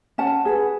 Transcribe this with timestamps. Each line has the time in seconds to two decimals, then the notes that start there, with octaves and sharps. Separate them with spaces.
0.18 C#4 F#5 A5
0.45 G#4 B4